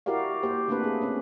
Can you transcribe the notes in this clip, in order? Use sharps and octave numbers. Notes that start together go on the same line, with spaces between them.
E4 F#4 G4 A#4 D5 F5
A#3 G4 C5
A3 A#3 C4 D4 G4 B4
G#4
C4 C#4